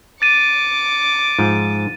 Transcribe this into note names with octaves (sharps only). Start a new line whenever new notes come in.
D6 A6 C#7 D#7
G#2 F3